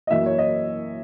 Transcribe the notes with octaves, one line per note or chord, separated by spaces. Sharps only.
D#5
F#2 E3 A#3 E5
C#5
D#5